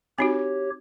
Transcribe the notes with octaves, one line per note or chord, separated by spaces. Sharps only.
C4 D#4 F#4 G4 C#5